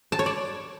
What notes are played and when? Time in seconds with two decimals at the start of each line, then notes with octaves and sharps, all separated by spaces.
0.12 A5
0.19 C#5
0.26 D5